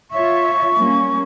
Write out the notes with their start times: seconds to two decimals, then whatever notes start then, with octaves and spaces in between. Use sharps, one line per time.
0.11 F4 C#5 E5 C#6
0.77 G3 A#3 C#4